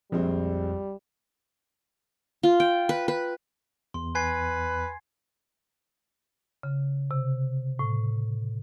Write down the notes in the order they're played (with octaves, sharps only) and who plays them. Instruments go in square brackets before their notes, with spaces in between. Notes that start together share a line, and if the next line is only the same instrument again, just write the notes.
[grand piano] A#1 G#3 C4 [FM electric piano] F2 [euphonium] G3
[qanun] F4
G5
B4
B4
[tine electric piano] E2 [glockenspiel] C6
[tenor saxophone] B4 [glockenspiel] G#5 G#6 C7
[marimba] C#3
C3
A2